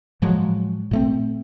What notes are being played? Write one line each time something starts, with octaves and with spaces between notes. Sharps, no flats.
A2 F3 F#3 G#3
A#2 A3 C4